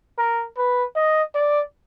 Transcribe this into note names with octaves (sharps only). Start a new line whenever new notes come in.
A#4
B4
D#5
D5